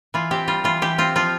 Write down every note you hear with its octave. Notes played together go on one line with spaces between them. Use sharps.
E3 F4
C4 G4
G3 F4
E3 F4
E3 G4
C4 F4
F3 F4